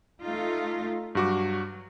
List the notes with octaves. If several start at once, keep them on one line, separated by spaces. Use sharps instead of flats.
A3 D#4 F4
G2 F#3 F#4 D6